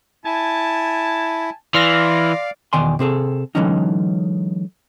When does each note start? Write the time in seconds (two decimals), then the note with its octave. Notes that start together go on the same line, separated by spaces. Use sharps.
0.25 E4 G#5 A5
1.74 E3 D5 F5 C6 F6 A#6
2.73 E2 B2 D#3 D5 G#5 C6
2.99 C3 C4 G#4 A4
3.55 D3 E3 F#3 G#3 C#4 D#4